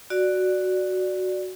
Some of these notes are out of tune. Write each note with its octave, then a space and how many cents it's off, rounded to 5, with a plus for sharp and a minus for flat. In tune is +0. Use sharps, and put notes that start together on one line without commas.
F#4 +0 D5 +5